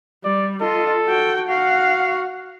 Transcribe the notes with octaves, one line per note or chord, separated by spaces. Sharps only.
G3 D5
F4 A4 D#5
F#4 G5
F#4 F5 F#5